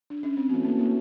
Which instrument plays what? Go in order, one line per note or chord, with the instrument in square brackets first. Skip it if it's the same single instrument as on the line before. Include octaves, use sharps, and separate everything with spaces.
[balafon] D4
C#4
C4
[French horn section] E3 A3 C#4 F#4 [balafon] B3
[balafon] A#3
A#3